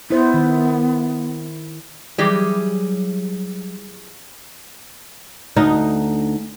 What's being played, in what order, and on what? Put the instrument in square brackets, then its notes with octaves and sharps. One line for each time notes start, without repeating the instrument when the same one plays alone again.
[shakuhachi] B3 [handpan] E4 C5
[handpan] D#3
[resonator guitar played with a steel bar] E3 G4 G#4 [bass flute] F#3 [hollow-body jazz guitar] G3
[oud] D2 D#4